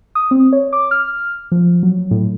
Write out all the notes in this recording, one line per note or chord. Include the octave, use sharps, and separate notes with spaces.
D#6
C4
C#5
D6
F6
F3
F#3
A2